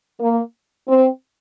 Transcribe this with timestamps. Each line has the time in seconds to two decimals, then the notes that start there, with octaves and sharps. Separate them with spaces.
0.20 A#3
0.89 C4